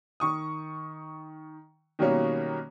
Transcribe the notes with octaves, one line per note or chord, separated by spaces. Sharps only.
D#3 C#6 D#6
B2 D#3 F#3 G3 A#3 C#4